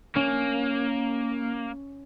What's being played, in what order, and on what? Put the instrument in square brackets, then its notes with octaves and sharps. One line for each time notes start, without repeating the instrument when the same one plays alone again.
[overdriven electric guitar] A#3 [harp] C#4